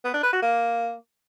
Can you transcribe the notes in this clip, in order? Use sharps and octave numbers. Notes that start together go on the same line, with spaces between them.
B3
D4
B4
F#4
A#3